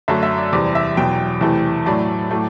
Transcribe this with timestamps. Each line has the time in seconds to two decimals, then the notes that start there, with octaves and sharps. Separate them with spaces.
0.08 F#2 D3 F#3 A3 E5
0.23 E5
0.38 D5
0.53 E2 C3 G3 D5
0.75 E5
0.96 E2 B2 F#3 G5
1.41 E2 C3 E3 A3
1.86 A2 F#3 A3 D5
2.31 A2 F#3 A3